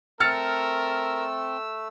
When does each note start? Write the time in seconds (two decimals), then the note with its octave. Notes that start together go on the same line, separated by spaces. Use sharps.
0.20 A3 C4 A#4 E6 F6 A6 C#7